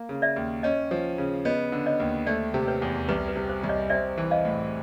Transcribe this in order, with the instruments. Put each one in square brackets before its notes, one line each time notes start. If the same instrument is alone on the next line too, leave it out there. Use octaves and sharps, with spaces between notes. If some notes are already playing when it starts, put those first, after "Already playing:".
Already playing: [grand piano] A#3
C#3
[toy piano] D5 E5
[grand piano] D#2
[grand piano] C#4 [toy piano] C#5 D#5
[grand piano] F3
C#3
[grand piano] B3 [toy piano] C#5 D#5
[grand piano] D3
[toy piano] C#5 D#5
[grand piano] D#2
[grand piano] A3 [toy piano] C5 D5
[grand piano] C3
[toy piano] B4 C#5
[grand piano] E2
[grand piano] C2 [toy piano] B4
[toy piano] B4
[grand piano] C3
[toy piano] C5
[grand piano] C2
[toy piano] C#5 D#5
[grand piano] C4 [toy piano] D5 E5
[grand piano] E3
[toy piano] D#5 F5
[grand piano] A2